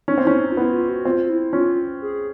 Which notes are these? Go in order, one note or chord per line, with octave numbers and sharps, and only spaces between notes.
C#4 D#4
C4
C#4 E4
D#4
F4
B3 E4
F4
F#4
C4 F4
E4
C#4 F4
G#4